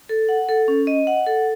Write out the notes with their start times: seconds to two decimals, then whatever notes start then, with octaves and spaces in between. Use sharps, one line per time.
0.09 A4
0.29 F#5
0.49 A4
0.68 C#4
0.87 D#5
1.07 F#5
1.27 A4